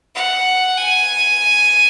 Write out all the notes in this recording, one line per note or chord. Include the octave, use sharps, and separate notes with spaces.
F#5
G#5